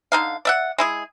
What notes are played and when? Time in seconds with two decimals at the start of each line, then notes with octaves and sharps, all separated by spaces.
0.12 D3 D#4 F5
0.45 D5 E5 F#5
0.78 G#3 E4 G#4